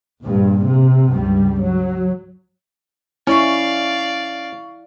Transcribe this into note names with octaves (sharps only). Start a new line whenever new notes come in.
A#1 G2
C3
C#2 G2 G3
F#3
C#4 E4 D5 F5 C#6